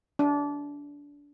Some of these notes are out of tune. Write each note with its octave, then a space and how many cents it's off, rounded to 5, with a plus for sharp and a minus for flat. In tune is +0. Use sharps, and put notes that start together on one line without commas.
D4 -25